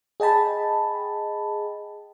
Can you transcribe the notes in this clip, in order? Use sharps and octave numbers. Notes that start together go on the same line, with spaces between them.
G#4 D#5 G5 A5 B5